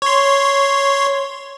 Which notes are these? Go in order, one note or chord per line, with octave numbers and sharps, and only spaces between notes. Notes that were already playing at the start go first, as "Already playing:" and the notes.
C#5 C6